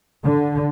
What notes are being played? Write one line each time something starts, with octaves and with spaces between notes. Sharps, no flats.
D3